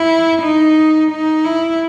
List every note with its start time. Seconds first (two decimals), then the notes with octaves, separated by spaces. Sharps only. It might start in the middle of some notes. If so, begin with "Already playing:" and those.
Already playing: E4
0.42 D#4
1.10 D#4
1.44 E4